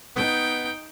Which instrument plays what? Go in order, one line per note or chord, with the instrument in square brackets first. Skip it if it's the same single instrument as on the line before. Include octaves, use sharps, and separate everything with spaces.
[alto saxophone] B3 [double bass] D#4 [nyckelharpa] G5